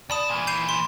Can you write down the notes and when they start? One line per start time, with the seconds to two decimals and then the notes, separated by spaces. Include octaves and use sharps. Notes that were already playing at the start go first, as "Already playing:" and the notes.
0.10 D2 D5 A5 B5 D#6
0.30 A#2 E3
0.47 G6 C7 D#7
0.69 C6